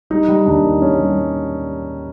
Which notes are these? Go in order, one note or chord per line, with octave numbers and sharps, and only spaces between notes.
G3 D#4
G3
D#2 D4
D#3
G3 C#4
G3